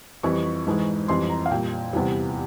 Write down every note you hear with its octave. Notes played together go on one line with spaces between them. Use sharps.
F2 E3 G3 C#6
G#2 E3 G#3
F2 E3 G3 C6
A#5
F5
A#2 G3 G5
E2 C3 E3 G3